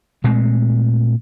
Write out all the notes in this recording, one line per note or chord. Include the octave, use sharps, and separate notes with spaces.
A#2 G#3 A3 C4